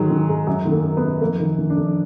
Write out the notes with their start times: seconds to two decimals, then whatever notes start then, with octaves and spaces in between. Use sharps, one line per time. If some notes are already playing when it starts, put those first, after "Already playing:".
Already playing: G#2 D#3 F#3
0.10 D#3
0.29 G#2
0.47 F#2 F#3
0.65 D#3
0.72 A#3
0.84 F#2
0.97 B3
1.03 F#2
1.20 F2 A#3
1.40 D#3
1.58 D#3
1.70 D4
1.76 F2